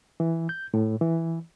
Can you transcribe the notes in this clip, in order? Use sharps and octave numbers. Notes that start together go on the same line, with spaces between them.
E3
G6
A2
E3